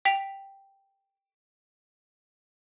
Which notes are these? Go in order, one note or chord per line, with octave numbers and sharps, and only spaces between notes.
G5 B6 F7